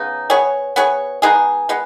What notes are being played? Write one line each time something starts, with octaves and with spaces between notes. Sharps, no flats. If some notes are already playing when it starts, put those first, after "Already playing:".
Already playing: C#3 B3 D#4
B3 G#4 C#5
B3 G#4 C#5
G#3 B3 D#4 G#4
G#3 B3